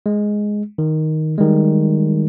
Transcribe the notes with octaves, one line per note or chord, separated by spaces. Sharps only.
G#3
D#3
D#3 G3 G#3